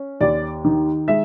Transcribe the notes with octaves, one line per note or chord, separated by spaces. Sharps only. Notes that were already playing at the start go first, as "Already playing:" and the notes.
Already playing: C#4
D#2 D5
D#3
G#3 E5